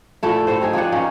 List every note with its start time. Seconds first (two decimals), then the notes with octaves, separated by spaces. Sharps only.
0.23 A#2 A3 E4
0.47 E4 G4 A4 C5
0.62 C4 D#4 G#4 A#4
0.73 F3 G#4 D5 F#5
0.92 A#3 C#4 D#4 G#4